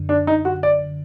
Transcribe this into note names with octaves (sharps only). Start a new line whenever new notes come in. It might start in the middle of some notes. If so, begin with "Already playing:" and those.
Already playing: F#2 D3
D4
D#4
F#4
D5